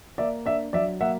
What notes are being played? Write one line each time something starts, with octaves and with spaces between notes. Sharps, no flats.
A#3 D5 E5
D4 D5 E5
F#3 D5 E5
A#3 E5 F#5